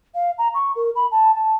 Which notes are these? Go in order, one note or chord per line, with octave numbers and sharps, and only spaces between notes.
F5
A#5
C#6
A#4
B5
A5
A5